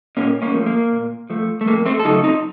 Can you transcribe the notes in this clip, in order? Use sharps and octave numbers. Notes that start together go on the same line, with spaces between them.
A#2 A#3 C#4
A#3 C#4
F3 A3
A#3
A#2
F3 A3
A3
F2 A#3
A3 C4
A4
C#3 F#3 A3 D#4 F#4
C4 D#4